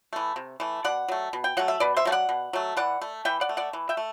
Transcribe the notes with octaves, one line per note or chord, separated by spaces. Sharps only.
E3 A3
C3
E3 A3
B2 D5 F#5
F#3 A3
B2
G5
F#3 A3 F#5
E5
B2 B4 D5
C5 E5
F#3 A3
D5 F#5
B2
F#3 A3
E3 D5 F#5
A3
E3 E5 G5
D5 F#5
A3
D5 F#5
E3
E5 G5
A3